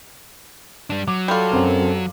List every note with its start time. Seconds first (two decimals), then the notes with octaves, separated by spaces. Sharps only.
0.90 G3 D4
1.08 F#3 D6
1.28 G3 F4 A4
1.52 F#2 C4 A#4